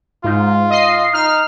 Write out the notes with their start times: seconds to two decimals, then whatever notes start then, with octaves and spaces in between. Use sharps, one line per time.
0.24 G#2 F4
0.70 D#5 C7
1.13 D#4 F6